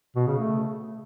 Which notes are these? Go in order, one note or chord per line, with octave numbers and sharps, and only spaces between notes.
B2
C#3
A3